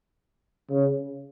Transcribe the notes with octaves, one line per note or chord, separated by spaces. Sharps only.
C#3